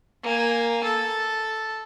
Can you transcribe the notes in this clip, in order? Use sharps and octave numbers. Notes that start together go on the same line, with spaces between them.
A#3 G#5
A4